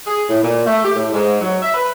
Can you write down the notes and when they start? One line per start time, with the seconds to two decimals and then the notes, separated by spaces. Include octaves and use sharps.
0.07 G#4
0.30 A2
0.43 A#2
0.66 A3
0.84 G4
0.96 A2
1.12 G#2
1.41 F#3
1.62 E5
1.74 B4